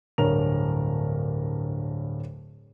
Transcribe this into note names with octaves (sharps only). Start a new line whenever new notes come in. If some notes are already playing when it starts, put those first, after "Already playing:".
D1 G2 A#4 C#5 F7